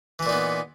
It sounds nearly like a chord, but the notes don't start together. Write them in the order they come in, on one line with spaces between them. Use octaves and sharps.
E3 E4 A#2 D#4 B3